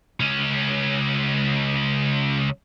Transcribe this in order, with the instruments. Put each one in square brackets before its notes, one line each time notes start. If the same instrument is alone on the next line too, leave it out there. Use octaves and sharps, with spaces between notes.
[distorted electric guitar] C#2 C#4